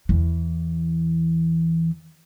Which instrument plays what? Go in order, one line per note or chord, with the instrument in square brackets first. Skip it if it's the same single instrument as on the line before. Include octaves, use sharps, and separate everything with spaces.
[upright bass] E2 E3